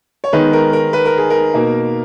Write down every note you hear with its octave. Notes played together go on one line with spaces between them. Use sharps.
C#5
D#3 G#3 B3 D#4 B4
A#4
A#4
B4
A#4
G#4
A#4
B2 A#3 D#4